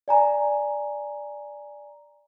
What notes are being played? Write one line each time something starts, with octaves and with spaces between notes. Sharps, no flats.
D5 G#5 A#5